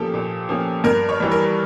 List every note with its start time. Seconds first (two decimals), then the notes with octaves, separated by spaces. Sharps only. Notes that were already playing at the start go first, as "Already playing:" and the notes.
Already playing: A#2 F3 A#3 C#4 G4 A4
0.14 A#2
0.49 F3 A#3 C#4
0.84 G2 A#4
1.09 C#5
1.20 E3 G3
1.31 A#4